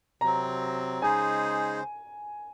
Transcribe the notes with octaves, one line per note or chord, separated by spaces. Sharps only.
C3 F#3 C4 A#5
C#3 G#3 D#4 G#4 C5 G#5